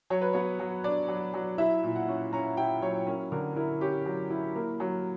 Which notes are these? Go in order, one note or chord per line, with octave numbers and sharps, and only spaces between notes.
F#3 C#5
B4
B3 C#5
F#3
D4 D5
F#3
F#3
E4 E5
A#2
F#5
C#4
C#4 A#5
E4 G5
F#3 C#5
C#4 A#4
D3 A#4
E4 A#4
C#4 G4
F#3
E4
A#3 A#4
F#3